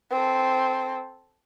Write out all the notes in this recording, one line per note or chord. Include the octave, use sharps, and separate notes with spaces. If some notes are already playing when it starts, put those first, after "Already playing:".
C4 A4